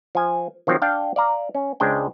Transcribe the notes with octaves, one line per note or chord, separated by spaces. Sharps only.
F3 G#5
D#3 F3 F#3 C4
D4 F5 G5 A5
D5 F5 A#5
C#4
C#2 G#3 D4 C5 G5